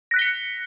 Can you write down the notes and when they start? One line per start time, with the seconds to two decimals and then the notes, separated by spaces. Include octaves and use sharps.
0.11 A#6
0.14 F#6
0.16 B6
0.19 G7
0.22 C#7